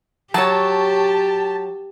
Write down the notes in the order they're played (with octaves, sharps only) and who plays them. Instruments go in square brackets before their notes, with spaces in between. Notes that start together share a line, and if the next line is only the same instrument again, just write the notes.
[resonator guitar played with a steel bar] F#3 C#5 [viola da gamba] G4 [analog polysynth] A5